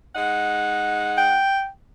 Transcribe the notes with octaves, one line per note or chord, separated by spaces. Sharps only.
G#3 D#4 F#5
G5